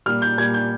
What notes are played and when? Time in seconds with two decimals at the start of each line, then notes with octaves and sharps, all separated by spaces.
0.06 A#2 G3 F6
0.22 G6
0.38 A#2 G3 G#6
0.54 G6